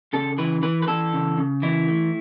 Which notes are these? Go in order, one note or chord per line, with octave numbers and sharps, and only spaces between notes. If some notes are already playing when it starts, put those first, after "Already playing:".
C#3 A4
E3 B4
E3 B4
B4
E3 A4
C#3
C#3
E3 E4
A3